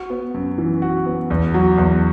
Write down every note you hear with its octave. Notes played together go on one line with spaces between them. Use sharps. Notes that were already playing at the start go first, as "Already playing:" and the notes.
Already playing: F#4
B3
F#2
E3
F#4
B3
E2
F#3
E2